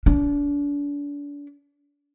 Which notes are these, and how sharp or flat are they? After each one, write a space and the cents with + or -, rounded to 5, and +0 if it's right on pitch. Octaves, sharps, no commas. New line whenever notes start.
D4 -35